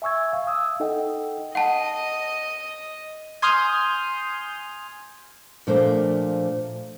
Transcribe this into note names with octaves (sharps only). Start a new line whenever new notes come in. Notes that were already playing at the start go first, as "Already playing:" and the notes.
E5 G#5 C#6 E6 G#6
F5
D#6 E6
D#4 A4 D#5 F#5 G5
D#5 F#5 A5
G#5 C6 D#6 F6 G6
A#2 F3 A3 D4 C5